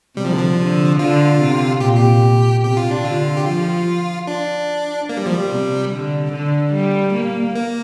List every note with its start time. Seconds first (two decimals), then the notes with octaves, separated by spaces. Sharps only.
0.17 C3 G3
0.25 F3
0.32 D3
0.39 F3
0.59 D3
0.99 D3 F4
1.41 C3
1.80 A#2 G4
1.96 G4
2.63 C3 G4
2.77 F4
2.91 D4
3.04 D3 F4
3.37 G4
3.45 F3 F4
4.27 D4
5.09 A#3
5.17 G3
5.26 F3
5.34 G3
5.49 C3
5.91 D3
6.32 D3
6.73 G3
7.14 A#3
7.55 A#3